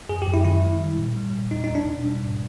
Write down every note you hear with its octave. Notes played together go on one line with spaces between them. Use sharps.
F#2 G#4
G4
F#2
E4
D#3 E4
G#3
G3
A#2
G3
A#2
E2 D#4
D#4
E2
D4
B2
G3
G#2